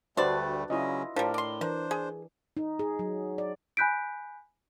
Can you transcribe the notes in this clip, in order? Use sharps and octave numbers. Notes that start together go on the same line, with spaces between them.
D2 G3 A3 D4 F#4 B4 C5 D5
C#3 F#3 C#4 E4 F4 D#5
A2 F3 G3 D4 A#4
D5 C6
E3 D4 A#4 C5
G#4
D#4
G#4
F#3
D5
G#5 B5 F#6 G6 B6 D7